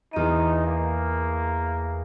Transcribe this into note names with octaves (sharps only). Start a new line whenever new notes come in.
E2 D#4 D#7
A#3